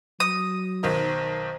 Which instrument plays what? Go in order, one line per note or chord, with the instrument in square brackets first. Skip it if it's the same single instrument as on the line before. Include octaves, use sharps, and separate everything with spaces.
[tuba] F#3 [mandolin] D#6 [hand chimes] A#6
[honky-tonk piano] B1 D#3 D#5 [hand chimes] C5 A#5